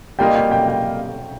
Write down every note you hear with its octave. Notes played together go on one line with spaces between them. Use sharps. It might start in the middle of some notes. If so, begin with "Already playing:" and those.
G3 A#3 F4 A#4 D#5 G5
G5
G5
G5